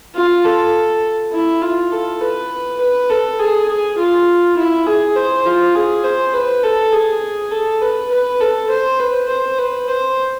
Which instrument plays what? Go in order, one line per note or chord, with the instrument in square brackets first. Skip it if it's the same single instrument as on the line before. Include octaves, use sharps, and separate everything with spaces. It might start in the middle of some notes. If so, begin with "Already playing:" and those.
[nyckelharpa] F4
A4
E4
F4
A4
B4
B4
A4
G#4
G#4
F4
E4
G#4
C5
F4
G#4
C5
B4
A4
G#4
A4
B4
B4
A4
C5
B4
C5
B4
C5